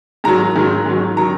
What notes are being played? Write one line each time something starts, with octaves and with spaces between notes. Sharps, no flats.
G#2 D#3 F#3 A#5
G#2 D#3 F#3
G#2 D#3 F#3
D#3 F#3 A#5